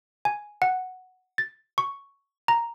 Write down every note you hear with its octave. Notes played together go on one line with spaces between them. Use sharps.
G#5
F#5
A6
C#6
A#5